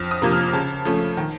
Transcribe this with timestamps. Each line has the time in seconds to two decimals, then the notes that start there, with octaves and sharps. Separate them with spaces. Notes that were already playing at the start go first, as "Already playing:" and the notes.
Already playing: F2 F6
0.11 D#6
0.22 C3 F3 A#3
0.32 F6
0.53 C#3 A5
0.85 F3 A3 C#4
1.17 D#3